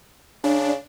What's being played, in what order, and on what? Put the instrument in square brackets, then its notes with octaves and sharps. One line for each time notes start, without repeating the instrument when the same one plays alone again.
[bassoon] C#3 [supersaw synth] D4